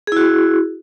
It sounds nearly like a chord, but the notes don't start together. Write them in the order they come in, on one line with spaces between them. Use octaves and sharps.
G#4 E4 F#4